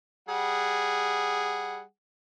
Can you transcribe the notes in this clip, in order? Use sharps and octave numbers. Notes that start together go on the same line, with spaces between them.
G3 G#4 F#5